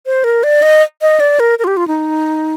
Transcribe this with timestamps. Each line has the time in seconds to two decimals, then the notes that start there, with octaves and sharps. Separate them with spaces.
0.06 C5
0.24 A#4
0.43 D5
0.62 D#5
1.02 D#5
1.20 D5
1.40 A#4
1.59 A#4
1.64 F4
1.67 G4
1.77 F4
1.88 D#4